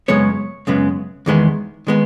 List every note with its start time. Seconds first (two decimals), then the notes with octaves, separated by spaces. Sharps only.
0.08 F#2 C#3 G#3 B3 C#5
0.67 F#2 C#3 G#3 B3
1.26 E2 D#3 G#3 B3
1.87 D#3 G#3 B3